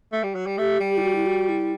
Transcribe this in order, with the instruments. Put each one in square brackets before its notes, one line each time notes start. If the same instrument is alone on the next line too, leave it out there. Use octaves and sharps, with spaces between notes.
[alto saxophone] A3
G3
F#3
G3
[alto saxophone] A3 [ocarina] G4
[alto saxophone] G3
[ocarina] E4
F#4
E4
F#4
E4